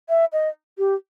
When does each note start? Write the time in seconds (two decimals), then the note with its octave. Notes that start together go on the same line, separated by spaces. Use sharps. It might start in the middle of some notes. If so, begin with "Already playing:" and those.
0.09 E5
0.33 D#5
0.78 G4